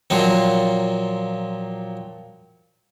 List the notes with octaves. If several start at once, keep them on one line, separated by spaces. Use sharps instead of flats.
A#2 F3 F#3 C4